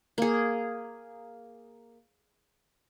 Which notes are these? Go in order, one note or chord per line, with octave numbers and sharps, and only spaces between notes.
A#3 G#4